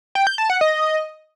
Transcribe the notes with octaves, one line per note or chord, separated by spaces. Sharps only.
G5
G6
A5
F#5
D#5